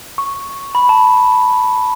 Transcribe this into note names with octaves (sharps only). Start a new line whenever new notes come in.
C#6
B5
A5